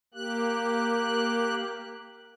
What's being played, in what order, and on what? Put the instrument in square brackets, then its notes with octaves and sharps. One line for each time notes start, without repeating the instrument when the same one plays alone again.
[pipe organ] A#3 G4 F#6